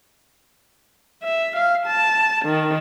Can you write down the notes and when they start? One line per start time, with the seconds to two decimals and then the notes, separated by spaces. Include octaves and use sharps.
1.23 E5
1.56 F5
1.86 A5
2.45 D#3